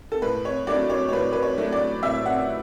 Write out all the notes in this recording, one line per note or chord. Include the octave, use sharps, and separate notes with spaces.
A4
A2 B4
C#5
F#3 A3 D4 D5
C#5
C#5
A2 B4
B4
C#5
F#3 A3 D4
D5
A2 E5
F#5